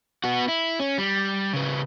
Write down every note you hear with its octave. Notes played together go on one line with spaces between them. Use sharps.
B3 F#4
E4
C#4
G3
C#3 B3